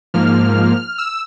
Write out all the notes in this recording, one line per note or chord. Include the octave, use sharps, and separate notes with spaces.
G#2 F3 A#3 F6
E6